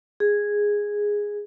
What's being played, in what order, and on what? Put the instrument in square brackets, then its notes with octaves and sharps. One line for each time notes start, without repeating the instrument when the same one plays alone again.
[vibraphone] G#4